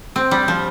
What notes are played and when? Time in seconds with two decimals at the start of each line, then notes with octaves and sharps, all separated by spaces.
0.16 C4
0.31 G3
0.48 F3